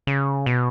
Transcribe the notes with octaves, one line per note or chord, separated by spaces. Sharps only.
C#3
B2